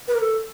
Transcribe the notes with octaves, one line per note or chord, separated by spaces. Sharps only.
B4
A#4
A4